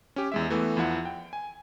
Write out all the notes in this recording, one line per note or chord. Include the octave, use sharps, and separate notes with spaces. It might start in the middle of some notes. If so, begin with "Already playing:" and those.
C#4 G4
E2 G#3 E5
E3 A3 B3
E2 F3 E4 F#5
G5
G#5